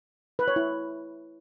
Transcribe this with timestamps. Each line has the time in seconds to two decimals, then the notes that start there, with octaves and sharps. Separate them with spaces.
0.39 B4
0.48 C#5
0.56 E4